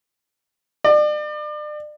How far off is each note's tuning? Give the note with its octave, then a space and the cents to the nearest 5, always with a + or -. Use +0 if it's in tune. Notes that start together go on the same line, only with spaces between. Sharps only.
D5 +35